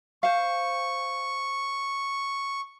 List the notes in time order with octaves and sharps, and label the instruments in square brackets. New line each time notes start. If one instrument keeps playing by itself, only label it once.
[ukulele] C5 F5 [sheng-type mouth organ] C#6